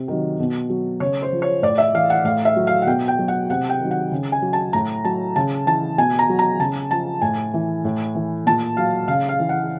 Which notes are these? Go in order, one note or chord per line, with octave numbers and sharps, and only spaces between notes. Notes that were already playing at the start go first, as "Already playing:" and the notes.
Already playing: C3
D#3 F#3
B2
F#3
C#3 C#5
C5
F3
C#5
A2 D5
E5
E3 F5
F#5
A2 F5
E5
F#3
F5
F#5
B2 G5
G5
F#3
F#5
C3 F#5
G5
D#3 F#3
F#5
C#3
G#5
F#3
A5
A2 A#5
F#3 A5
C#3 A5
E3 A5
B2 G#5
A#5
F#3
A#5
C#3 A5
F3 A5
A2 G#5
E3
A2
E3
A#2 A5
F#3 F5
C#3 F5
F5
E3
F#5